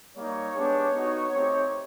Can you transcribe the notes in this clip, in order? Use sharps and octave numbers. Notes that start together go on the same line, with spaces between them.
G3 A#3 D#4 C#5
G#3 B3 D4 G4
B3 D#4 F#4
A3 C4 D#4 G4